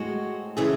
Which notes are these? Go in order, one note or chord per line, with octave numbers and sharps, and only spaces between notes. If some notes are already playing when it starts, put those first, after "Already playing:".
Already playing: A2 G#3 C4 F#4
C#3 E3 A3 G#4